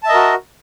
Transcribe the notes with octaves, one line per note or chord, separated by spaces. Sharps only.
F#4 A#4 D#5 E5 A5